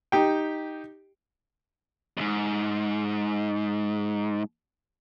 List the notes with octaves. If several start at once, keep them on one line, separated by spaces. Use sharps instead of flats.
D#4 G4 G5
D#2 G#2